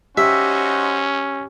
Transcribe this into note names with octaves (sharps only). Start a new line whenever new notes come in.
C#4 D#4 F#4 G4 C5 E5